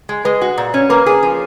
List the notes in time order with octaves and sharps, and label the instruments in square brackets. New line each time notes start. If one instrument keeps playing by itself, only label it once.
[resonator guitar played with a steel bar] G#3
[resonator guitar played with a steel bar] G#3 [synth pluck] B4
[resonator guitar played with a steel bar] F#4
A#2
C#4
[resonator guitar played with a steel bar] A#3 [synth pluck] B4
[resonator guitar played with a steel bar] G#4
F3